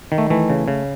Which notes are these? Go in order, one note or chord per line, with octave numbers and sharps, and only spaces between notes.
D#3
A3
E3 A3
C#3
C#3